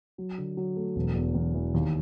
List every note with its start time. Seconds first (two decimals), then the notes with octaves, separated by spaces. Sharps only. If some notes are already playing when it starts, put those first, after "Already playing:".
0.18 F#3
0.38 D3
0.57 F#3
0.76 A3
0.96 E1
1.16 E2
1.34 E2
1.54 E3
1.74 D#2